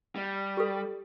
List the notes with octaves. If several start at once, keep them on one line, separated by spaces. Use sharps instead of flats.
G3
G4 A4